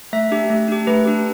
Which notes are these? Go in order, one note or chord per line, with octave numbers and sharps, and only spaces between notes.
A3 E5
D4 G4
A3
D4 G4
A3 B4
D4 G4